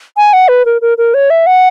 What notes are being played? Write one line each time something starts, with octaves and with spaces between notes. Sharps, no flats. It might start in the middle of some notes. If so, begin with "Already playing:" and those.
G#5
F#5
B4
A#4
A#4
A#4
C#5
E5
F#5